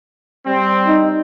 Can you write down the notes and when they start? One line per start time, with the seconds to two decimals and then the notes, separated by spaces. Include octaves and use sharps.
0.46 G3 C4
0.87 D#4